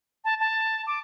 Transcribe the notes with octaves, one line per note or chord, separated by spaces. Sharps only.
A5
A5
D6